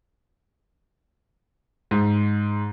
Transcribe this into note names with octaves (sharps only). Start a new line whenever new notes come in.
G#2